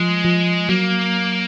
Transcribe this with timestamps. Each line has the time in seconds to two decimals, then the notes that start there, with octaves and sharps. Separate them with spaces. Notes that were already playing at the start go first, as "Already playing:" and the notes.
Already playing: F3 G#3
0.25 F3
0.69 F#3 A#3